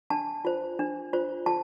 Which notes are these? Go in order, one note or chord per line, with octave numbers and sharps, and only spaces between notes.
D4 A5
F4 C5
D4
F4 C5
F4 A5